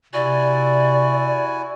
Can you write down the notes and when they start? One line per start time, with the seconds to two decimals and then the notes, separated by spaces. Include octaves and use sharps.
0.13 C3 E4 F#4 D5 G#5